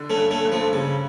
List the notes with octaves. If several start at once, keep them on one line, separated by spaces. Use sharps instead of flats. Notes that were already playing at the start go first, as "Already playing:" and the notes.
Already playing: D3
A3 C#4
G2
A3 C#4
G2
F3 A3
C#3 G3